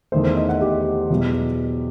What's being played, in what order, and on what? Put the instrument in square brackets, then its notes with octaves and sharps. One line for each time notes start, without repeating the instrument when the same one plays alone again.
[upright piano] E2 D#3 A3 C5
C5
D#5
F#5
G4
E2 B2 F#3